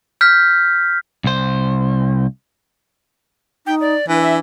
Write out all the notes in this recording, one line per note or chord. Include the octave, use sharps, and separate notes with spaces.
F6 G6 B6
C2 C5
D#4 G5
D5
E3 D4 B4
E5